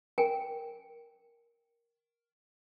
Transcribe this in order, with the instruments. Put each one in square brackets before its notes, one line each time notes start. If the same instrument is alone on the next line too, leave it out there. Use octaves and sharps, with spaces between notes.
[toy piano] A#4 G5 G#5